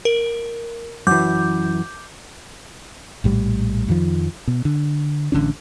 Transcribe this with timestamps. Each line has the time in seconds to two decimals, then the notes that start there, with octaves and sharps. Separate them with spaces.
0.05 A#4
1.07 F#2 E3 D6 G6
3.24 A#1 A2 G3
3.88 F2 D#3 F3
4.47 B2
4.65 D3
5.32 A1 D3 C#4 D4